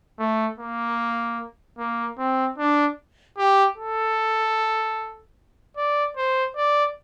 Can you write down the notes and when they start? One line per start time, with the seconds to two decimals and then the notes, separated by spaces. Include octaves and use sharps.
0.19 A3
0.59 A#3
1.79 A#3
2.19 C4
2.58 D4
3.38 G4
3.77 A4
5.77 D5
6.17 C5
6.57 D5